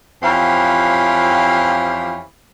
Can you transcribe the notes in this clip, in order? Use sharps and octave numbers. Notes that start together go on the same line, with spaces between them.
F2 E3 C#4 G4 C5 F5